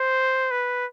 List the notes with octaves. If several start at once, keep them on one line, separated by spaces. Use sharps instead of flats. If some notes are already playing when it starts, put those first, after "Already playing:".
Already playing: C5
B4